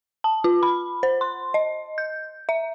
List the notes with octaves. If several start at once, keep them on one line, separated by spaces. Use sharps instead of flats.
A5
F4
B5
C5
C6
D#5
G6
E5